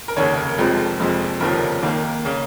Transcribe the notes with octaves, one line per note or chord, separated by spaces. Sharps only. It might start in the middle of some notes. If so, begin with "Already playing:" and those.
A#4
F1 D#2 C#3 C#5
A#4
F1 F2 F3 G#3
F1 F2 F3 G#3
F1 D#2 C#3 F3 A#4
D#2 D#3 A#3
C#3 A#3